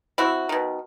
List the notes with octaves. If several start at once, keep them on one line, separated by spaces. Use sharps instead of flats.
C4 E4 F#4
B2 D#3